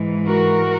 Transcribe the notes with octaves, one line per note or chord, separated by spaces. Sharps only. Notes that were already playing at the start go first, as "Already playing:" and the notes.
Already playing: G#2 E3 G#3
F#4 A#4